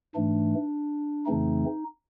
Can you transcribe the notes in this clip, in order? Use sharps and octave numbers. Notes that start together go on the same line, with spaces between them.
G#2 E3 A3 D4
F2 C#3 E3 A3 C4 D#4